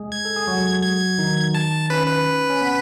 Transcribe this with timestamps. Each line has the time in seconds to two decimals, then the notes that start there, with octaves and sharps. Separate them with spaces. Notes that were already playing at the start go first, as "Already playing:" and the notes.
Already playing: G#3 G#4
0.12 G#6
0.25 A4
0.36 G#4
0.47 F#3 F#4
0.82 G#6
1.18 D#3 D#4
1.54 A5
1.90 C#4 B4
2.07 B4
2.50 C#4
2.61 B3